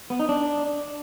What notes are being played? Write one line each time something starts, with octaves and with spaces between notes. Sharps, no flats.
B3
D#4
D4